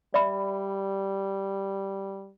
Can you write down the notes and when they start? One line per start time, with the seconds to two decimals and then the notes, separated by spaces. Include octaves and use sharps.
0.14 G3 D5 E5 B5